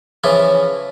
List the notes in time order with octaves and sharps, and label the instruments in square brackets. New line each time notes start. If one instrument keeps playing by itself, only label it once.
[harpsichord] C#3 E3 F3 E4 F4